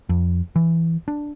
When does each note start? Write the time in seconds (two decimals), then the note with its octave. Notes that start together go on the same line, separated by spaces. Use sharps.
0.09 F2
0.56 E3
1.08 D4